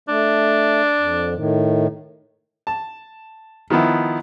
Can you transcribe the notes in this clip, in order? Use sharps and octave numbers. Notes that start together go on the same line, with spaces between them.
A3 D4
F2
A2 D#3
A5
D#3 F3 B3 E4